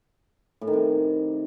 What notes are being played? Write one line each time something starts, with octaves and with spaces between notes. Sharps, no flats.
A2
D#3
C3